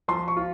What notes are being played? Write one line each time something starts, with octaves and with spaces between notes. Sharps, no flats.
F3 C6
C#6
F4